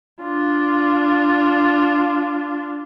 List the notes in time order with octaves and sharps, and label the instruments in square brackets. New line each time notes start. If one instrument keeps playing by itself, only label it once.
[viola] D4 F4